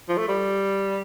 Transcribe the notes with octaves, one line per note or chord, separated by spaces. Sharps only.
F3
A3
G3